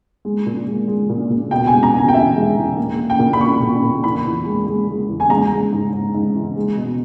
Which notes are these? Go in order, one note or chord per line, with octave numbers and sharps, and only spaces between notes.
G#3
A#2
G#3
G#3
A#2
A#2
B2 G5
G#3 G#5
A#5
B2 G#5
G5
E2 E5
G#3
E2
A#3
A#3
G5
A#2
B5
A#2 C#6
A#2
A#2
E2 B5
E2
G#3
G#3
G#3
E2
G#5
G#3 A#5
G#3
G#2
G#2
G#2
E3
G#3
B2